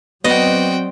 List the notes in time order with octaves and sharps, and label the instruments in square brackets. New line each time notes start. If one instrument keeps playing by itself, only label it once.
[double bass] F#3 C4 [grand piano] B3 [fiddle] F#4 G5 [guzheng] D5 D#5